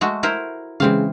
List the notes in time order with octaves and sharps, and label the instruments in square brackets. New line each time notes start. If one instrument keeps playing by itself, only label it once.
[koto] G#3 A3 F#4
E4 A#4 C5
[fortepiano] C#3 G#3 [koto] E3 C4 F5